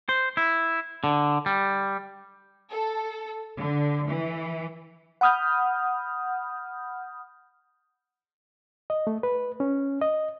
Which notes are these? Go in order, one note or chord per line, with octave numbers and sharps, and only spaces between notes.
C5
E4
D3
G3
A4
D3
E3
F#5 B5 D#6 F6 G6
D#5
A3
B4
C#4
D#5